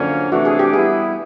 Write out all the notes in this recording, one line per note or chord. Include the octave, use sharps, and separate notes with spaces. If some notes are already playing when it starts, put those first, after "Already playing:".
Already playing: F#2 D3 F3 A#3 C#4
C3 E3 A3 D4 F#4
G#4
G4
G3 B3 E4 G#4